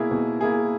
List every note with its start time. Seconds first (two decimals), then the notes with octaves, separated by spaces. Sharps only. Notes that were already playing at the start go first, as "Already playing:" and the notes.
Already playing: B2 A#3 E4 G#4
0.11 B2
0.41 A#3 E4 G#4